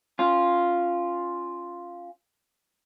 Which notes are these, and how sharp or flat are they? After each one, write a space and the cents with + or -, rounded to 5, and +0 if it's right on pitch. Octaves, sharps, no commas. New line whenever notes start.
C#4 -10 F4 +0